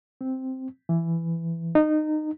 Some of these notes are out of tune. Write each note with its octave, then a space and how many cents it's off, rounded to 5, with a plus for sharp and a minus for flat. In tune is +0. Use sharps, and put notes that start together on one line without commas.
C4 +0
E3 +15
D#4 -20